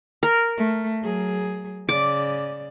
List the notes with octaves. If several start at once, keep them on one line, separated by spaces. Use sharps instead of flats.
A#4
A3
F#3 G#4
C#3 D5 D6